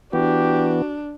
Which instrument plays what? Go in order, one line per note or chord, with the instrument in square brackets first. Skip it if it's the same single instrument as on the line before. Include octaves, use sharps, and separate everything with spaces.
[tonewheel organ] E3 B3 [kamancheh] D4 [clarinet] F#4 [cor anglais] G4